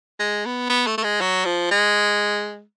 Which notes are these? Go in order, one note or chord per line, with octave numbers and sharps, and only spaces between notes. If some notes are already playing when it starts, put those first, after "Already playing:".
G#3
B3
B3
A3
A3
G#3
F#3
F3
G#3